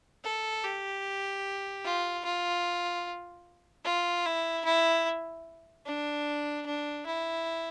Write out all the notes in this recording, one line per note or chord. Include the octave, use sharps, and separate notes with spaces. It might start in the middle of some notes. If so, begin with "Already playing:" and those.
A4
G4
F4
F4
F4
E4
E4
D4
D4
E4